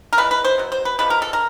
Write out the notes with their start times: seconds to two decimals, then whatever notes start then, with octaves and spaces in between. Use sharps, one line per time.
0.13 A#4
0.17 C#3 E3 G#3 B4
0.31 B4
0.44 C5
0.58 B2 F#3
0.72 C5
0.85 B4
0.99 D3 F3 G#3 B4
1.10 A#4
1.22 A4
1.33 A#4